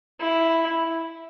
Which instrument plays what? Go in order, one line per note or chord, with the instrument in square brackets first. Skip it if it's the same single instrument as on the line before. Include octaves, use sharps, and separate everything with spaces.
[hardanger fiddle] E4